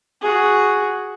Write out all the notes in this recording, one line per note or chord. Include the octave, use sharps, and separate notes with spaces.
F#4 G#4